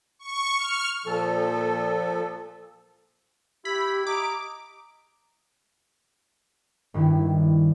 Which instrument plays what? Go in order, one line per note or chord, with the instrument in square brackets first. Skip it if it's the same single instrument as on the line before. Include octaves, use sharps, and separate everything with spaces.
[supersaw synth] C#6
F6
[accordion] A#2 F3 A4
[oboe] E4 [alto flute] G4 [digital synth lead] B5
[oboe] D#5 [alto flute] A#5 [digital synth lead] D6
[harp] G#1 G2 D#3 E4